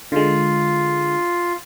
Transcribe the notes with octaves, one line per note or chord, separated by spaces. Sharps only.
D3 G#3 F4